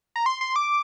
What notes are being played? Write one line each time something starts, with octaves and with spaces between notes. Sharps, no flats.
A#5
C6
C6
D6